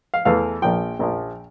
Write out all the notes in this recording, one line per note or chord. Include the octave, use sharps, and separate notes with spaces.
F5
E2 E3 A3 F5
A#1 A#2 F3 G5
A#1 A#2 F3